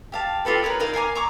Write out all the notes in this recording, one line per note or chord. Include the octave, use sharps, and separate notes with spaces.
G4 F5 A5
F4 G4 A4 B4
A#4 B4 C#5 D#6
D#4 A#4 F5
A#4 F5 G#5 D6
A#5 C#6 D6